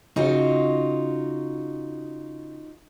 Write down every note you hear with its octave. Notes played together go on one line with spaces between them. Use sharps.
C#3 D#4 F4 F#4